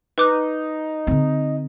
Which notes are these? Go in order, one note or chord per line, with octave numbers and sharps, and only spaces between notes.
D#4 B4 D6 F#6
D3 C4